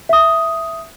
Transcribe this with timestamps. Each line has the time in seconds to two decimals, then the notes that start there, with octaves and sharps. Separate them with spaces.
0.09 E5 D#6